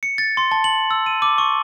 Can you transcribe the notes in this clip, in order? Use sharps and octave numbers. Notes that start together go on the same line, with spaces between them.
C#7
A6
C6
A5
F#7
E6
D#7
D6
C#6